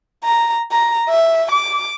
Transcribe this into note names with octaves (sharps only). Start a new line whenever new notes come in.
A#5
A#5
E5
D6